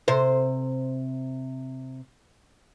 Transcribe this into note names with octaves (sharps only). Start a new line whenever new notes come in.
C3 C5